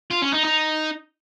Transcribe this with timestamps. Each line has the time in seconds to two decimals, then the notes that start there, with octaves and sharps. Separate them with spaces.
0.11 F4
0.22 C#4
0.33 D#4
0.44 D#4